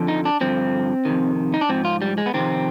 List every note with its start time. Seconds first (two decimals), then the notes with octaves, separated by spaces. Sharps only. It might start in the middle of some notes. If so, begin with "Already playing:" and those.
Already playing: F2 D3 F3
0.08 D#4
0.25 D4
0.41 G2 D3 F3 C4
1.05 F2 C3 D#3
1.54 D#4
1.61 D4
1.69 G#2 F3 C4
1.85 F4
2.02 G3
2.18 G#3
2.26 B3
2.34 F2 C3 D#3 C4